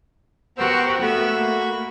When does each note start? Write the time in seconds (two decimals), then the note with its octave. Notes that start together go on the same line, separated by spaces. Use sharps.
0.58 B3 F#4 G4 A#4 C5 E6
1.01 A3 B3 F#4 B5 C#6 E6
1.34 A#3